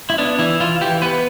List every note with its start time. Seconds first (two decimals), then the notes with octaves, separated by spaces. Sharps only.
0.10 E4
0.18 B3 D4
0.39 E3 E4
0.60 E3 F4
0.81 E3 G4
1.02 B3 B4